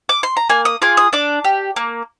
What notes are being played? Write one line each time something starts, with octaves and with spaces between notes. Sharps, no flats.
D6
C6
A#5
A#3 G#5
D#6
F4 G#4 D6
D#6
D4 D6
G4
A#3